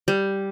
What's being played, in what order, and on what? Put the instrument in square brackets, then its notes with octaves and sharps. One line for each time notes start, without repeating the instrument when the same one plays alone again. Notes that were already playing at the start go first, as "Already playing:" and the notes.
[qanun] G3